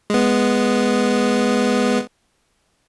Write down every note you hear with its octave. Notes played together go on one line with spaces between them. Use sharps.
G#3 B3